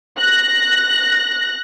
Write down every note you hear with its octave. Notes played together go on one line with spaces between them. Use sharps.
F#6 A#6